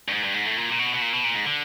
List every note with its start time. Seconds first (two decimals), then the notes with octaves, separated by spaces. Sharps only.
0.08 G2
0.12 G#2
0.24 G2
0.34 G#2
0.46 A2
0.57 A#2
0.72 A#2
0.79 B2
0.94 B2
1.02 A#2
1.13 B2
1.24 A#2
1.35 G#2
1.46 D3